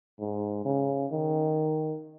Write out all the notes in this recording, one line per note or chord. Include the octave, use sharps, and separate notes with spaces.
G#2
C#3
D#3